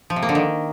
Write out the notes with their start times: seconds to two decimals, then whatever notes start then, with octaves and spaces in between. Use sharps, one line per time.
0.10 F3
0.16 C3
0.23 A#3
0.29 D3
0.35 D#3